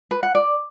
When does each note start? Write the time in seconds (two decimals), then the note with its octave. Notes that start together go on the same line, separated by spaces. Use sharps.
0.11 B4
0.23 F#5
0.35 D5